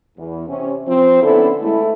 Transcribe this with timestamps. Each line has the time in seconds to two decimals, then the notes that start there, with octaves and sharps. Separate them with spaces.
0.18 E2
0.49 C3 C#4
0.88 F3 C4
1.23 D3 B3 C#4 E4 A4
1.62 G#3 A3 E4